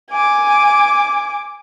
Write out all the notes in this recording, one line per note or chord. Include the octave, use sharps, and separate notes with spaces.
G#5 D6